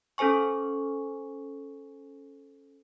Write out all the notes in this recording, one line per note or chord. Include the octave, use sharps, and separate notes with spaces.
C#4 A4 C5 G#5 C#6